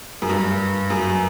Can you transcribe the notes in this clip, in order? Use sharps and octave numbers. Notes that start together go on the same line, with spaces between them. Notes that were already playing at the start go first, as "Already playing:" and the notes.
F#2
G2
F#2